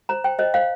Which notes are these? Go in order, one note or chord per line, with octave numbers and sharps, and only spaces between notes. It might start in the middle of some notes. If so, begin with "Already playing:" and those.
C5 A#5
C5 G5
C5 D#5
C5 F5